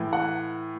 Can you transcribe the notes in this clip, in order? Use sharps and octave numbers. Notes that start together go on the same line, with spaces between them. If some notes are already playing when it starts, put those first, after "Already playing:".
Already playing: A2 E3
F#5